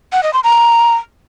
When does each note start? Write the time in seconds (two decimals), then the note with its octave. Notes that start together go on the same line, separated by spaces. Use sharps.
0.13 F#5
0.23 D#5
0.33 C6
0.44 A#5